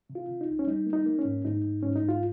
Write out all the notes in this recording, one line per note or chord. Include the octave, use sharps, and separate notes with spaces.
C3
F4
C3
D#4
C2
C#4
G3 D#4
A#3
D#4
A#3
C#4
G#2
G#2 D#4
G#2
G#2 C#4
D#4
G#2
F4